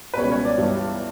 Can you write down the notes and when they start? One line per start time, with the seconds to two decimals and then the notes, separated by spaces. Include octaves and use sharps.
0.14 B4
0.17 C#2 B2 G3 C#5
0.32 C#5
0.45 D5
0.58 G1 G2 E3 G3